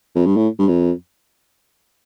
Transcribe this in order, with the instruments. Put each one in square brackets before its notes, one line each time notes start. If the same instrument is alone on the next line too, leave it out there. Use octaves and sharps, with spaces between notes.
[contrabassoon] F2
G2
A2
G2
F2